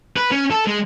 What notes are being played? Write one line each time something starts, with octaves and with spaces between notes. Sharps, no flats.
B4
C#4
A4
G#3